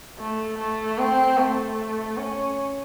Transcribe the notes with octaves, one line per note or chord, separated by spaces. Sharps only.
A3
A3
C4
A3
C#4